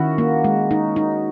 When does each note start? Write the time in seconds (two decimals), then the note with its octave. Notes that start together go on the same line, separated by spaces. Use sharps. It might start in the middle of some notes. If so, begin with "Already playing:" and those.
Already playing: D#3 C#4 E4 F#4
0.18 A#3
0.44 G#3
0.71 D#4
0.96 D#4